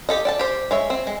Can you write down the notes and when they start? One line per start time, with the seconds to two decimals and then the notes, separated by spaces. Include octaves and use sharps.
0.09 G4 A4 D#5
0.25 D5 G5 A5
0.39 G4 C5
0.71 G#3 C#5 E5
0.90 C4
1.07 G#3